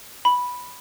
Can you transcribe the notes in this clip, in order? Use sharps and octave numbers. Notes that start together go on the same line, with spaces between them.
B5